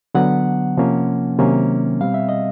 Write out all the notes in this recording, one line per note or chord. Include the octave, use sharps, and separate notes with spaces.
D3 F#3 B3 F#5
C3 F3 A#3 C#4
C3 D#3 F#3 A#3 C#4
B2 G3 C4 F5
E5
D#5